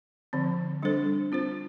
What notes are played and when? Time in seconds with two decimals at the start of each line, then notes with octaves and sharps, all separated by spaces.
0.33 D3 F3 C4
0.82 G3 D4 A4 C5
1.32 C4 F4 C5